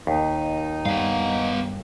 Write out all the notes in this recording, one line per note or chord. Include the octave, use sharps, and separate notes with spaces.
D#2 D#4
G2 B3 F5